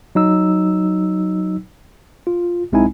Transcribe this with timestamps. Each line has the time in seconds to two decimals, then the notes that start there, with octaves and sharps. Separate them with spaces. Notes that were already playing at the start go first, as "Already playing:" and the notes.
0.15 F#3 D#4 E6
2.27 F4
2.72 B1 G#3 C4 D#4 E4 G#5